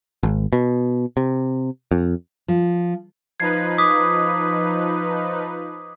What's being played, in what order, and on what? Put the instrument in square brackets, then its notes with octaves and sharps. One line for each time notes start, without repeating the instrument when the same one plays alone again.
[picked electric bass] G#1
B2
C3
F2
[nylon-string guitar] F3
[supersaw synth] F3 D#4 B4 [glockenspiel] G#6 C7
[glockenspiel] D6 D#6 B6